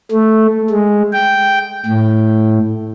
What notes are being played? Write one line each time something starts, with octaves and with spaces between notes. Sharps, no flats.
A3
G#3
G5
A2